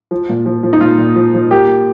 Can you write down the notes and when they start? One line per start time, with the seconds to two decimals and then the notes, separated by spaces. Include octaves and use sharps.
0.11 F3
0.29 A#2
0.46 F3
0.63 F3
0.73 D#4
0.81 A#2 F4
0.98 A#2
1.16 F3
1.34 F3
1.51 A#3 G4